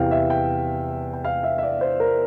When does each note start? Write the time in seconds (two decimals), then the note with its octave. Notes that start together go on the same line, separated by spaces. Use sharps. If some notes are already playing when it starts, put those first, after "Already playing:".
Already playing: E2 C3 E3 F5 G5
0.11 E5
0.30 G5
1.13 G5
1.25 F5
1.44 E5
1.58 E5
1.63 D5
1.81 C5
2.00 A#4